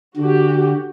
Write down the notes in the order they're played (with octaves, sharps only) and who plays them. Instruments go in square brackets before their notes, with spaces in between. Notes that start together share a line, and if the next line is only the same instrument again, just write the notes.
[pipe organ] D3 [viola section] F#4 G4